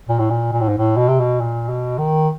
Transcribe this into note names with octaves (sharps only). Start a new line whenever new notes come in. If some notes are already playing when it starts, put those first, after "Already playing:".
A#2
A2
A#2
A#2
A2
G#2
A2
B2
C3
B2
A#2
B2
D#3